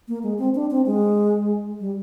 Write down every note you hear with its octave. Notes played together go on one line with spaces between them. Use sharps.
A#3
G#3
C4
D4
C4
G#3
G3